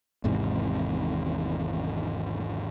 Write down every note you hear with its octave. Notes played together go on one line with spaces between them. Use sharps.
G#1 E2 G#2 C3